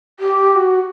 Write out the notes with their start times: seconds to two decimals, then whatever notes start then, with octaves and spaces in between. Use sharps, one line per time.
0.20 G4
0.50 G4
0.55 F#4